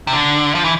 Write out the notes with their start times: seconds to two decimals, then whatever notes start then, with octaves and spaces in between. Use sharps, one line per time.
0.07 C3
0.13 D3
0.55 F3
0.65 E3